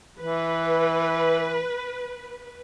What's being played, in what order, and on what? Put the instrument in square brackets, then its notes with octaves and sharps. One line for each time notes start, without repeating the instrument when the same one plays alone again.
[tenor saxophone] E3 [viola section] B4